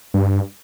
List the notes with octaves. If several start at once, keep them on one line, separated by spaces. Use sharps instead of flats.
G2